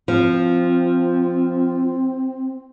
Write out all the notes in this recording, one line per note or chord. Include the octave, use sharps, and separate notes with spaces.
F3 C4